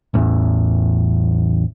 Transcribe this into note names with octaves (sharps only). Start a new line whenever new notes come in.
A1 E2